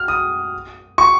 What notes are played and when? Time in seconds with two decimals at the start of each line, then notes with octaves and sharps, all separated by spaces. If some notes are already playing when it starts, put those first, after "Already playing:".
Already playing: F6
0.08 D#6
0.98 C#6